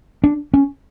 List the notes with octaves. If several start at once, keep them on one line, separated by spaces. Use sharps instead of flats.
D4
C#4